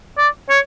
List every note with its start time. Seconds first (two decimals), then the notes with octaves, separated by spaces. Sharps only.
0.18 D5
0.49 C#5